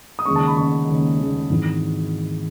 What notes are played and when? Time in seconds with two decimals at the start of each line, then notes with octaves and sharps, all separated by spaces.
0.19 D#6
0.25 D#2 C#3 G#3 C#4 C#6
0.36 A5
0.47 B5
0.56 D#2 C#3 G#3 C#4 C#6
0.89 D#2 C#3 G#3 C#4
1.19 D#2 C#3 G#3 C#4
1.49 G#1 G#2 E3